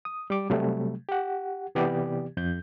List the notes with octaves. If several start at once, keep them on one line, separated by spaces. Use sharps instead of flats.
D#6
G3 D6
C3 F#3 G3 A3
G4 F#5
C3 E3 B3 G4 D5
F2 G6